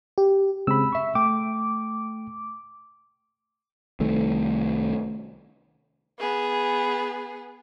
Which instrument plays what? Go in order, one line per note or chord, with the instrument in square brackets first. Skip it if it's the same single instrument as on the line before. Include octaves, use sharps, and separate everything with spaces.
[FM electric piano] G4
[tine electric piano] C#3 G#3 C4 [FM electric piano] B5 E6
[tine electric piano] E5 C#6
[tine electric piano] A3 G5 [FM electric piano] D6
[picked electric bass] C2 D#3 A3
[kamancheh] B3 G#4